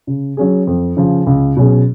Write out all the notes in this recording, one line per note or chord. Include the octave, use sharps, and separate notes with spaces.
C#3
F#3 C#4 G#4
F2
C#3 F3
C#2
B2 F#3 C#4 G#4